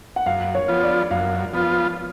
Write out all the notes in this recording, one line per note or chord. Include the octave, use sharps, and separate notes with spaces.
F#5
F#2 F5
C#5
F3 B3 F4
D5
F#2 F5
F3 B3 F4